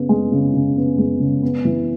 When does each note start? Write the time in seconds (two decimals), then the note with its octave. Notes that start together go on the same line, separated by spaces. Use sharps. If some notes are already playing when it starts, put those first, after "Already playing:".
Already playing: C#3 B3
0.09 G#3
0.32 C#3
0.54 C#3
0.76 B3
0.98 G#3
1.20 C#3
1.42 B3
1.65 E3